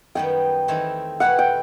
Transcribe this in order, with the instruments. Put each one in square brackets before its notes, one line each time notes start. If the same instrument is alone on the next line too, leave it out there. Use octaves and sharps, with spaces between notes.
[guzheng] F#2 D#3 G3 B3 [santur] G5
[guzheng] E2 D#3 A3 C4 E4
[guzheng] B2 A3 E4 G4 B4 [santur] F#5
[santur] G5